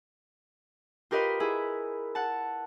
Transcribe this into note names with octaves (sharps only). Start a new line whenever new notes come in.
F4 G4 A#4 B4 D#5 F5
E4 G#4
F#5 A5